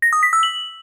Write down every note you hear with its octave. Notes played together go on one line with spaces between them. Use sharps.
A#6
D#6
B6
E6
F#7